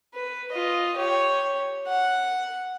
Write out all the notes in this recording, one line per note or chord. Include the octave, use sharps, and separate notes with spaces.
B4
F4 D#5
G4 C#5
F#5